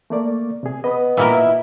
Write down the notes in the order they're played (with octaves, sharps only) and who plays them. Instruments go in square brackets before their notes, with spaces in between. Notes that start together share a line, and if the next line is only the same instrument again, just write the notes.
[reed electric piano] A3 A#3 D5
C3 G#4
[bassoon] B3 [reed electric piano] D#5 B5 D#6
[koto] A#2 A#3 A#4 [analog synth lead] E4